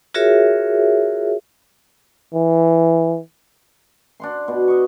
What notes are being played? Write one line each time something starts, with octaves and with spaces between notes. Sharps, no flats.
F4 F#4 G#4 A#4 C#5 E5
E3
D4 F#5 C6
B2
D#5 C#6